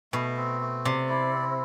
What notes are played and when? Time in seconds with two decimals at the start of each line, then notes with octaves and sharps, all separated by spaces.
0.13 B2 A3
0.37 C4
0.61 A3
0.85 C3 D5
1.09 E4
1.33 C4